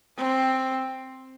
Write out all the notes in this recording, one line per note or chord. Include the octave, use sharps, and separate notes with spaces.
C4